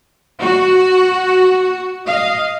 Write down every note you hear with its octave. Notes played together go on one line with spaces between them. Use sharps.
F#4
D#5 F5